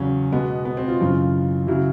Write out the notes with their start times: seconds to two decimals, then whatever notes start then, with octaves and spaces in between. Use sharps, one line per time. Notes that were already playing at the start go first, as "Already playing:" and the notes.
Already playing: E2 C#3 F#3 C#4
0.32 B2 G#3 B3
0.65 B3
0.77 C4
0.88 F4
1.00 F#2 C#3 E3
1.67 C#3 F#3 E4